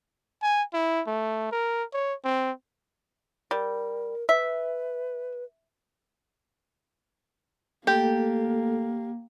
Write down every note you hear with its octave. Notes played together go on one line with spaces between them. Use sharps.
G#5
E4
A3
A#4
C#5
C4
G3 A#4
B4 E5
A3 A#3 G4 A4